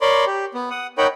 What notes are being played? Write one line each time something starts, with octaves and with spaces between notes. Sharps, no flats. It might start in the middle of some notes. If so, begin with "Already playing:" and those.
A#4 C#5 D5 B5 C6 D6
G4
B3
F#5 D#6
D#4 A#4 C#5 F#5 G5 B5